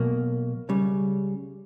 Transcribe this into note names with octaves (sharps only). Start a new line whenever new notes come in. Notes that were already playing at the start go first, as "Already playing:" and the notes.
Already playing: B1 B2 A#3
C#2 C#3 G3